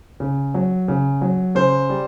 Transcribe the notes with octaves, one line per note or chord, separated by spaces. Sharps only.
C#3
F#3
C#3
F#3
C#3 C5
G3